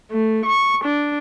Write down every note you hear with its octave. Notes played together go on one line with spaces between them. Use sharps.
A3
C#6
D4